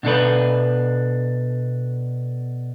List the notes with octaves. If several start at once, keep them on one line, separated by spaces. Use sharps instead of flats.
B2 D4 A4 B4